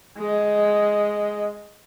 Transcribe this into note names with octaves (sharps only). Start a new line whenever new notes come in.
G#3 D#5